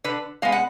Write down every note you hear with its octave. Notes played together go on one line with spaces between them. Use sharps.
D3 B4
G#3 B3 F5
F#5